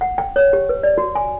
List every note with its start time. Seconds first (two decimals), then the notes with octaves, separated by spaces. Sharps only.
0.01 F#5
0.18 G5
0.36 C#5
0.53 G4
0.69 B4
0.83 D5
0.98 F#4
1.15 G#5